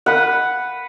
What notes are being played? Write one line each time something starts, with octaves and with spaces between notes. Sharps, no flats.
B4 F#5